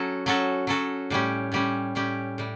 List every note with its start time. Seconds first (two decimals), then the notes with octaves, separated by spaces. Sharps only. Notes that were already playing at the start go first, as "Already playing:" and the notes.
Already playing: F#3 C#4 F#4 A4
0.26 F#3 C#4 F#4 A4
0.67 F#3 C#4 F#4 A4
1.10 A2 G3 C#4 G4
1.52 A2 G3 C#4 G4
1.95 A2 G3 C#4 G4
2.38 A2 G3